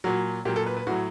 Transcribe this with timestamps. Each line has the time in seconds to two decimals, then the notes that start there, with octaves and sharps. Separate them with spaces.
0.04 A#2 F#3 F#4
0.45 A#2 G4
0.48 F#3
0.56 A4
0.66 B4
0.77 B4
0.87 A2 F#3 F#4